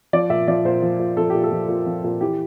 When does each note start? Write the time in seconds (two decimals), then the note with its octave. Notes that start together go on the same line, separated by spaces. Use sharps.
0.13 F3 D5
0.30 A#2 E5
0.48 F3 D5
0.65 A#2 C5
0.82 F3
0.99 A#2
1.17 F3 A4
1.30 A#2 G4
1.44 A4
1.51 F3
1.69 A#2
1.86 F3
2.04 A#2
2.21 E3 G4